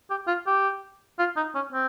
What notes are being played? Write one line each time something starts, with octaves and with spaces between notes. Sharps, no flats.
G4
F4
G4
F4
D#4
C#4
C4